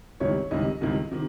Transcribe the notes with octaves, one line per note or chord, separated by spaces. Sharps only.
C#2 C3 D#3 G3 C#5
C#2 C3 D#3 G3 D#5
C#2 C3 D#3 G3
C3 D#3